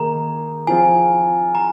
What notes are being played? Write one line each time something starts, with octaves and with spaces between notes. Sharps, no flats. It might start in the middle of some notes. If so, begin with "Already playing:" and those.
Already playing: D#3 A#3 D#4 G#4 A#5
F3 C4 F4 G#4 G#5
A#5